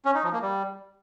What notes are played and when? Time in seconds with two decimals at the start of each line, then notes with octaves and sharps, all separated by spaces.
0.05 C#4
0.14 D#4
0.23 F3
0.33 A#3
0.42 G3